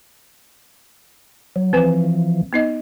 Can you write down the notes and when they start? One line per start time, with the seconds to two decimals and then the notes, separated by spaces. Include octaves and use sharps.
1.56 F#3
1.73 E3 F3 C4 B4 G#5
2.53 B3 D#4 D#5